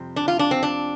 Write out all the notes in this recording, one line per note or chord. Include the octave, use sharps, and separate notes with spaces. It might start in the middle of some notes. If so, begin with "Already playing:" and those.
Already playing: F2 C3 G3 C4
D4
F4
D4
C4
D4